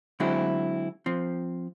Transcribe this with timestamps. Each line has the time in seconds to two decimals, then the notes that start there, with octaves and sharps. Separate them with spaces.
0.20 D3 F#3 G#3 C4 E4
1.06 F3 C4